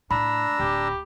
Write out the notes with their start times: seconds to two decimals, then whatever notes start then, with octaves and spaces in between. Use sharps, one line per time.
0.11 A2 D4 A#5 B5 E6
0.59 D1 G4